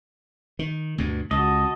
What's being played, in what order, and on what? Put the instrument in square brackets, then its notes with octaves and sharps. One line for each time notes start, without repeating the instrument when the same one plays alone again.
[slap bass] D#3
D2 G2 B2
[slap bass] C#2 [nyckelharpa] F#4 A5 [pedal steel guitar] D#5